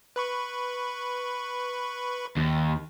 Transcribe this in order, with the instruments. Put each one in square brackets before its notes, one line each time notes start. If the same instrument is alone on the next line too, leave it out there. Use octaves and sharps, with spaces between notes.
[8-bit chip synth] B4 B5 C#6
[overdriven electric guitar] D#2